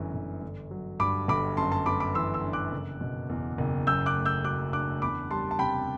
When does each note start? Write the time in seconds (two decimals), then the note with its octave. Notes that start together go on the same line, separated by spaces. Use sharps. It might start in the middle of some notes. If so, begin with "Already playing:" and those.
Already playing: G1 F#2 E3
0.14 G1
0.42 G1
0.71 F#3
1.00 G2 B5 D6
1.28 G1 B5 D6
1.57 F#2 A5 C6
1.72 A5 C6
1.86 B3 B5 D6
2.00 B5 D6
2.15 E3 C6 E6
2.34 C6 E6
2.44 D4
2.53 D6 F#6
2.72 F#1
3.01 B2
3.29 E2
3.58 F#1
3.87 F#2 E6 G6
4.06 D6 F#6
4.16 A3
4.25 E6 G6
4.44 F#3 D6 F#6
4.73 D4 D6 F#6
5.02 E2 B5 D6
5.30 G3 A5 C6
5.51 A5
5.59 C3 G5 B5